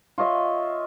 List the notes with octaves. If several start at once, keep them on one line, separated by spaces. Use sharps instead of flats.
F4 C#5 D#5 E5